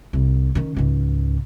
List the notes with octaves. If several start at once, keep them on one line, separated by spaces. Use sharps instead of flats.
C2
D#3 C#4
C#2 G#2